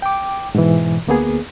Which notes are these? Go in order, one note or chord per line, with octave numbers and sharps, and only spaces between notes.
G5 D6
G#2 B2 E3
D2 A#3 B3 G#4